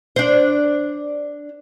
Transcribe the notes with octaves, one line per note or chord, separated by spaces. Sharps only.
D4 C5